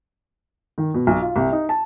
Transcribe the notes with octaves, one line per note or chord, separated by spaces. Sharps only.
D#3
B2
B1
F4
C2
D#4
A5